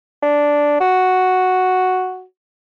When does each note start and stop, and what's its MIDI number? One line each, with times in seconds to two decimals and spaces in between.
0.22 0.80 62
0.80 2.23 66